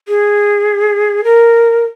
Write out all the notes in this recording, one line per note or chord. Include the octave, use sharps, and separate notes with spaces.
G#4
A#4